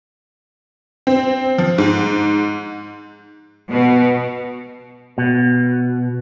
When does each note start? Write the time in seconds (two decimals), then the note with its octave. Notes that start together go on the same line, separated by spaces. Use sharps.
1.07 C4
1.58 F3
1.78 G#2
3.71 B2
5.18 B2